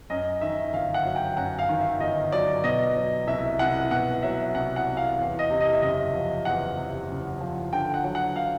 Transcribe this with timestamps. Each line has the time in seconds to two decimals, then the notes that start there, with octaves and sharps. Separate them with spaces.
0.10 F#2 D#5
0.41 D#3 E5
0.73 G1 F5
0.94 F#5
1.05 F#3
1.16 G5
1.37 F#2 F#5
1.59 F5
1.69 D#3
1.79 E5
2.00 G1 D#5
2.32 F#3 D5
2.64 B2 D#5
2.96 F#3
3.27 C2 E5
3.59 C2 F#5
3.91 B2 F#5
4.23 F#3 E5
4.54 C2 F#5
4.76 F#5
4.86 C2
4.97 F5
5.19 E2
5.39 D#5
5.50 C3
5.61 D#5
5.73 E5
5.82 F#1 D#5
6.14 F3
6.45 E2 F#5
6.77 C3
7.09 F#1
7.41 F3
7.73 D3 G5
7.94 F#5
8.04 F#3
8.15 F#5
8.36 F5